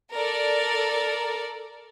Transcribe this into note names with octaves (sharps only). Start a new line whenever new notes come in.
A4 A#4 D5